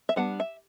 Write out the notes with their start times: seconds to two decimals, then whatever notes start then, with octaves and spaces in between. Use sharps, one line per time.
0.09 E5
0.16 G3 B3 D4 F#5
0.40 E5